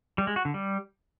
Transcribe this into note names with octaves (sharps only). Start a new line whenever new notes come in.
G3
G#3
F#4
D3
G3